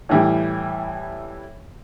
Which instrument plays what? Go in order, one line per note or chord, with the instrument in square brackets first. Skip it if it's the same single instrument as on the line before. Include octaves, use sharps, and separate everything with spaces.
[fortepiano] A2 E3 G3